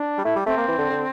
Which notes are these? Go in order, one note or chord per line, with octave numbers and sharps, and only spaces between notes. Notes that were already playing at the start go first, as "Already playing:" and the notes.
Already playing: D4
G3
A3 E4
G3
A3 C4
A#3
E3
D3
D3